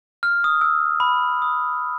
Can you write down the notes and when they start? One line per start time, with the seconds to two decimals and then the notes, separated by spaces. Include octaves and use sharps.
0.23 F6
0.44 D#6
0.61 E6
1.00 B5
1.42 D#6